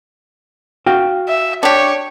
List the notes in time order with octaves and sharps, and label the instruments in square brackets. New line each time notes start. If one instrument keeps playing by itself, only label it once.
[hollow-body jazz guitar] F#4 F5 G5
[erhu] E5
[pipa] D4 G4 [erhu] C#5